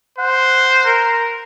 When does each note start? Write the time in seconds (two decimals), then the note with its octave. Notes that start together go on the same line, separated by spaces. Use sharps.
0.19 C5 F#5
0.85 A#4